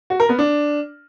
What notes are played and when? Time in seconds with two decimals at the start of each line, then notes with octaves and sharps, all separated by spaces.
0.10 F#4
0.20 A#4
0.29 B3
0.39 D4